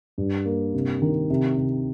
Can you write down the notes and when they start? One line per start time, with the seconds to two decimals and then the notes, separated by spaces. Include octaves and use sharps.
0.18 G2
0.46 A#3
0.74 C3
1.02 D#3
1.30 C3
1.58 C3